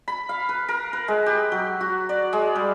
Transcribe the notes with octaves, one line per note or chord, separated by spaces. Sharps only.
B5
F5
B4
A#4
B4
G#3
G4
F#3
F#4
D5
G#3
G3